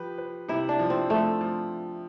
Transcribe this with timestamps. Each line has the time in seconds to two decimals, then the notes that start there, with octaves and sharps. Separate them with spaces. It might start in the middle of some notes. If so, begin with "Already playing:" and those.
Already playing: F3 G4 B4
0.18 B4
0.49 C3 E4
0.69 D4
0.79 F3
0.90 C4
1.10 F3 A3
1.41 F3